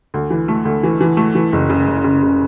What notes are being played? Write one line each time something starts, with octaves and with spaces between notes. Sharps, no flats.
D2
E3
A3
D2
E3
E3
A3
E3
F#1
C#3
F#1
C#3
C#3